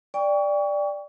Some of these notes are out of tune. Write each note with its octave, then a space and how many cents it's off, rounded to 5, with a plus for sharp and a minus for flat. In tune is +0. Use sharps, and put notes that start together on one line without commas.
D5 +0 G5 +25 C#6 +30